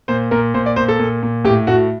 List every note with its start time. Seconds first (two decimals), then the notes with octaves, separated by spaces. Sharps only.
0.08 A#2 C5
0.31 A#2 A#4
0.54 A#2 C5
0.66 D5
0.76 A#2 C5
0.88 A4
1.00 A#2
1.23 A#2
1.45 A2 G4
1.67 A2 F#4